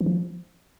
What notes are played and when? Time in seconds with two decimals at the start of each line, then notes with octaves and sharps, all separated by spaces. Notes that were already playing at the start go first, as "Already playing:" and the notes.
0.01 E3
0.06 F3